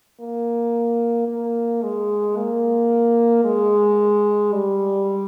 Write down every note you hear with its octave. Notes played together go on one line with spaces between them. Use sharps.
A#3
A#3
G#3
A#3
G#3
G3